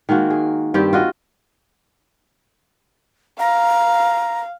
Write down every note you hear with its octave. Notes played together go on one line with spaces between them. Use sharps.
D#3 G#3 A#3 F#4
G#4
G2 D#3 C4 G4
F4 F#4 D#5
F5 A#5